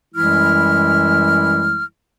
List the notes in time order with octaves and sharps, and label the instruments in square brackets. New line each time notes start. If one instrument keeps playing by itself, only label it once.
[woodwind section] F#2 E3 G3 G#3 E4 F6